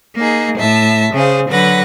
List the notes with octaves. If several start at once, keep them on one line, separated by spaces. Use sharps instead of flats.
A#3 D#4 G#4
A2 E5 A5
C#3 G#4 C5 F5
D3 F#3 B4 F#5 A#6